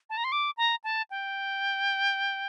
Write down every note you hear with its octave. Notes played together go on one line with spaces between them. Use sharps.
A5
A#5
C6
D6
A#5
A5
G5